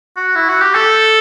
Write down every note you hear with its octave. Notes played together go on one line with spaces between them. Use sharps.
F#4
E4
F#4
G4
A4